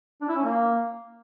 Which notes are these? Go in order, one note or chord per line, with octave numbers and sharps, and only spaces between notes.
D4
E4
C#4
A#3